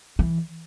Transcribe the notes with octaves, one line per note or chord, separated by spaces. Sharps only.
E3